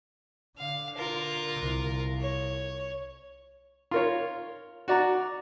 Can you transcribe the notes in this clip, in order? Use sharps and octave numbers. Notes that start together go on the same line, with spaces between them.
D3 F5
F4 A#4
C2
C#5
F4 A#4 C#5
F#4 D5 A#5